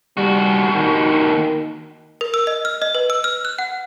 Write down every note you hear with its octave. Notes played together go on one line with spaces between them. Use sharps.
D#2 G3 F#4
D#3
A#4
E6
D#5
F6
D#5
B4
E6
F6
F#6
F#5